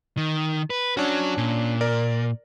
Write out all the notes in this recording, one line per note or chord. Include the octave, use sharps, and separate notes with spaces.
D#3
B4
C#4 D4 F#4 C#5
A#2
A#4 D5